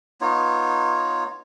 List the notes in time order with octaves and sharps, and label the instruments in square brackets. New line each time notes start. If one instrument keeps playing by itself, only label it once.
[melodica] B3 D#4 F4 C#5